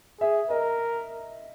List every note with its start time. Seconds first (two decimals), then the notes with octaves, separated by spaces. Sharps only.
0.21 G#4 E5
0.50 A#4 D#5